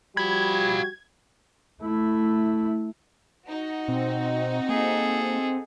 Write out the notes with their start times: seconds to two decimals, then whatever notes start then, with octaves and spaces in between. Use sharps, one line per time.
0.17 F3 G3 F4 F#4 B5 G#6
1.83 A3 E4
3.47 D#4 F#4
3.88 B2 C4
4.69 A#3 G#4 A4